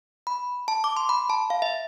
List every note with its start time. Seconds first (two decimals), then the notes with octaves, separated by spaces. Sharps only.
0.27 B5
0.68 A5
0.84 D6
0.97 C6
1.09 B5
1.30 A5
1.50 F5
1.62 E5